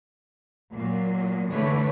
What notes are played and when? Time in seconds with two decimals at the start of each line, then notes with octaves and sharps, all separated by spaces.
0.75 A#2 F#3
1.51 D3 E3 A3 B4 C#5